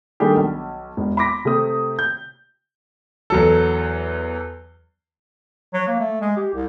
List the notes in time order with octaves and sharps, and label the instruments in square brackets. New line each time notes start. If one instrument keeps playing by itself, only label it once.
[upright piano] D#3 G3 A3 D4 G4 G#4
B1
E1
B5 C6 D6 A#6 B6
C3 A3 C4 D#6
G6
[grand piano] E2 F#3 A4
[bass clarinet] F#3
A#3
A3
G#3
G4
C2